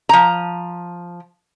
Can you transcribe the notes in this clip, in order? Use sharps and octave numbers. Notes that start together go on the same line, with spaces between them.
F3 A#5